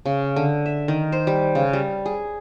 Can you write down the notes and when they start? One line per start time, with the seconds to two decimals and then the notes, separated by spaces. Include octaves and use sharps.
0.06 C#3
0.36 D3
0.66 E5
0.88 D#3
1.12 C5
1.27 G3
1.55 C#3
1.73 G3
2.06 G#4